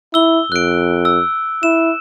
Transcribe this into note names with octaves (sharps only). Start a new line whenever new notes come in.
E4 E6 G7
F2 F#6 D7
E6
E4 E7